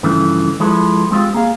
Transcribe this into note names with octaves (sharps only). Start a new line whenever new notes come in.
G2 C#3 E3 F3 A3
F3 G#3 E4 A4 B4
G#3 C4 D#4 F4 G4
A#3 G#4 F5